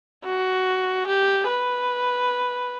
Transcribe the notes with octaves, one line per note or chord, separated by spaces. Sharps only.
F#4
G4
B4